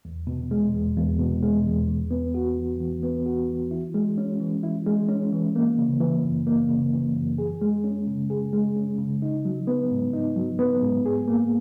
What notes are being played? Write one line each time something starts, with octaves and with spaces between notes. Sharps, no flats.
E2
B2
G#3
E2
E2
B2
G#3
E2
E3
B3
F#4
E3
E3
B3
F#4
E3
E4
G#3
C#4
E3
E4
G#3
C#4
E3
A#3
C#3
E3
F#2
A#3
C#3
E3
F#2
G#4
G#3
C#4
C#3
G#4
G#3
C#4
C#3
D#4
F#3
B3
G#2
D#4
F#3
B3
G#2
G#4
A#3